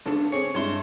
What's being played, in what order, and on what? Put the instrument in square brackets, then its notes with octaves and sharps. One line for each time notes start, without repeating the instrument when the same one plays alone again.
[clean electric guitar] B1 G#2 D4 [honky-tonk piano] C#3 A4
[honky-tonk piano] C4 G#4 [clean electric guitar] C#5
[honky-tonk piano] G2 G#3 E4 [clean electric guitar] C#5 C6